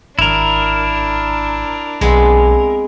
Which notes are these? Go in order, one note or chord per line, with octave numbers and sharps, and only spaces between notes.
G#1 D4 E4 A#4
B1 G#3 B3 C4